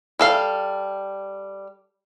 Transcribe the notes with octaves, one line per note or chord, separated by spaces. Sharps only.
G3 A4 F5